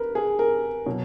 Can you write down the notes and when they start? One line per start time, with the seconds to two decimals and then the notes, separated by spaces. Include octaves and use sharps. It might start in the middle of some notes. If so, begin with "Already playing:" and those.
Already playing: A#4 B4
0.15 G#4
0.39 A#4
0.86 B2 F#3